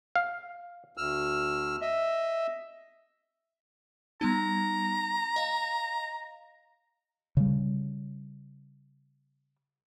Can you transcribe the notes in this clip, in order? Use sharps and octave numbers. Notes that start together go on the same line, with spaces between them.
F5
D2 E6 F6
D#5 E5
G3 B3 D#4 A#5
D#5 F5
C#3 G3